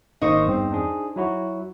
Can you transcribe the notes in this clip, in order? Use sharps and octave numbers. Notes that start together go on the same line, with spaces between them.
G#1 A#3 D#4 C5 C#6
E2 G2 C4
D4 G#4
F#3 E4 F#4